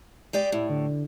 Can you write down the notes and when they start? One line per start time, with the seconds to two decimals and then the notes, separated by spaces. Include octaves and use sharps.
0.33 G#3 G4 D5
0.52 A2 E4
0.70 D3